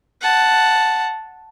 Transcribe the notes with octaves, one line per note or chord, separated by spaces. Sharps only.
F#5 A5